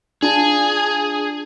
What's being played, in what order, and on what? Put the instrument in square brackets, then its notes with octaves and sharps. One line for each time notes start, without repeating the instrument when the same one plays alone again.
[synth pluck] D4 F4 A5 [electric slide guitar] G#4